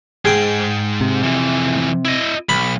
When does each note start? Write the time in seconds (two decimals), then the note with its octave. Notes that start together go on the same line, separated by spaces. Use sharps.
0.25 G#2 G#4 G5
1.01 C3
1.23 F2 E3
2.05 E4 D#5
2.49 B1 B5